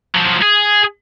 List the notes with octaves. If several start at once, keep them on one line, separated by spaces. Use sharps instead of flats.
F3 F#3
G#4